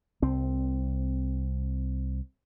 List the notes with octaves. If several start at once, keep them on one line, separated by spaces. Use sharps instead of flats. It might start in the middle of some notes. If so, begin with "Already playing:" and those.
C2 C4